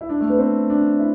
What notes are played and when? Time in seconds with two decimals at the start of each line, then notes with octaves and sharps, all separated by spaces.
0.01 E4
0.09 D4
0.20 A3
0.30 B3
0.39 C4
0.70 D4
0.99 E4